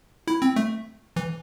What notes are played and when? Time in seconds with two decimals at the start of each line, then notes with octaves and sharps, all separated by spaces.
0.28 E4
0.42 C4
0.56 A3
1.16 E3